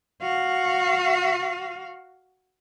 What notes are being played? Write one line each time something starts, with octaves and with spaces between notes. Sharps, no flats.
F#4 F5